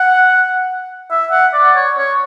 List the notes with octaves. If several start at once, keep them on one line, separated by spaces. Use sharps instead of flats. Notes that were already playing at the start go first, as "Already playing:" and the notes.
Already playing: F#5
E5
F#5
D5
C#5
C#5